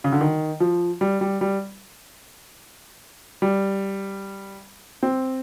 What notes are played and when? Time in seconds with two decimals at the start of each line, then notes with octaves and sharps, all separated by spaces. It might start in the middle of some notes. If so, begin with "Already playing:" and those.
0.04 C#3
0.12 D3
0.21 D#3
0.60 F3
1.01 G3
1.21 G3
1.41 G3
3.42 G3
5.03 C4